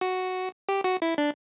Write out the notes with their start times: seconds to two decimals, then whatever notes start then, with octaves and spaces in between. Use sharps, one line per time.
0.01 F#4
0.69 G4
0.84 F#4
1.02 E4
1.18 D4